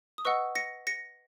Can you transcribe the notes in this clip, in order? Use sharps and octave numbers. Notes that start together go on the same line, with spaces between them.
D#6
B4 D#5 F#5 C#6 E6
A#6 C#7
A#6 C#7